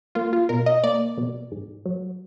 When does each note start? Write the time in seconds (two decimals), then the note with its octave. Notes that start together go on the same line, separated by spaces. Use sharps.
0.15 A#3 F4
0.33 F4
0.49 B2 A#4
0.66 D#5
0.84 A#3 D5
1.18 B2
1.52 G#2
1.86 F#3